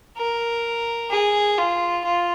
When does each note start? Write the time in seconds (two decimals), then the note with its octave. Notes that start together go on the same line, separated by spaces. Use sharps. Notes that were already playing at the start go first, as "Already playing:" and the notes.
0.17 A#4
1.10 G#4
1.58 F4
2.05 F4